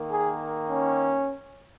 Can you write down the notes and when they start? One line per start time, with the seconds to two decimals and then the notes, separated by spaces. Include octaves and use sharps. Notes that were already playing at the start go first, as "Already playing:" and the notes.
Already playing: D#3 A#3
0.09 G#4
0.69 C#4